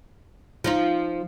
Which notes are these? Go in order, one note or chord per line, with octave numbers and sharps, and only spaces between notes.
F3 D#4 F4